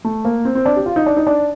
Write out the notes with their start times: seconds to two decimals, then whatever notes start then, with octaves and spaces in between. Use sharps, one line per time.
0.04 A3
0.25 A#3
0.45 C4
0.55 C4
0.66 D4
0.76 G4
0.86 F4
0.96 D#4
1.06 D4
1.17 D#4
1.27 D4